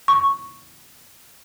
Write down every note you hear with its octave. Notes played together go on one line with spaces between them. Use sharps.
C#6